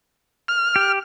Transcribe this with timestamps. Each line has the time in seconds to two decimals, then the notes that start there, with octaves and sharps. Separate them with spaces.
0.48 F6
0.76 G4